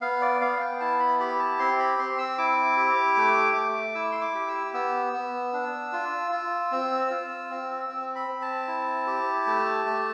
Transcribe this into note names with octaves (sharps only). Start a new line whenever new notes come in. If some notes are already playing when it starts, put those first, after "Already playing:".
B3 F5
D5
B3 F5
G5
E4 A5
B5
G4 B5
A5
C4 C6
B5
C4 C6
E6
E4 D6
G4
A3
A3
E4 E6
C6
D6
G4
E6
B3 E6
B3
D4
F4
F4
C4
F4
C4
C4
B5
C4
A5
E4
G4
A3
A3